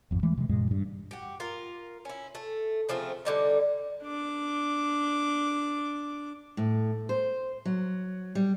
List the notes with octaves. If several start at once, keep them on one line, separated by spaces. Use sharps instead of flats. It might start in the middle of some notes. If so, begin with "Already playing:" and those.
G#1 F2
E3 G#3 A3
C3 E3 G#3
F#2 A#2 G#3
G2
F#4 G4
F4 A#4
C#4 E4
A3
C#3 F3 A3 C4
D3 G3 D#4
D4 D6
A2
C5
F#3
G3